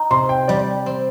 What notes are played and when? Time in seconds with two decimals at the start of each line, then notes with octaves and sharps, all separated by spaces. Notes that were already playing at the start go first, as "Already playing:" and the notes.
Already playing: D#4
0.11 C3 C6
0.29 G5
0.48 G3 D5
0.86 C4